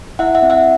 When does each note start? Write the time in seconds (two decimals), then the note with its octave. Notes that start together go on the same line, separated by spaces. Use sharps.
0.19 E4 E5 F#5
0.35 E5 F#5
0.42 C4
0.50 E5 F#5